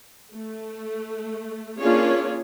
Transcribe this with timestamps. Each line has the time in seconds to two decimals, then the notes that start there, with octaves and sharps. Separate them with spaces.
0.34 A3
1.79 A#3 C#4 D4 F4 G#4 C#5